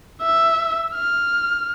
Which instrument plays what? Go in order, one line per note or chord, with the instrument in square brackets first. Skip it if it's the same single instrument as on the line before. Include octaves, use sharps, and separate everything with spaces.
[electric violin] E5
F6